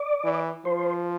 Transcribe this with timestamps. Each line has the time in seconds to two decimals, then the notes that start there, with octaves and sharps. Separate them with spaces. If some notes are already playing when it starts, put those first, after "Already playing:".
Already playing: D5
0.25 E3
0.65 F3 C5